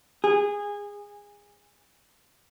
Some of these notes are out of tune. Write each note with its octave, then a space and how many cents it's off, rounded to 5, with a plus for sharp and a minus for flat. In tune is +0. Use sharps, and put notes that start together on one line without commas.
G#4 -20